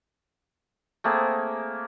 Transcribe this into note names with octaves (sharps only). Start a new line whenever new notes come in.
A3 A#3 C4 G#4